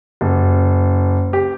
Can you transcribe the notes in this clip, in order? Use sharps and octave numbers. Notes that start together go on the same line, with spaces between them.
F#1
G4